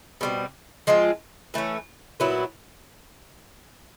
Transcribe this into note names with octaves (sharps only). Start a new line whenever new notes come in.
B2 G3 C4
F3 G#3 C4 F4
E3 A3 C#4
A#2 F#3 B3 E4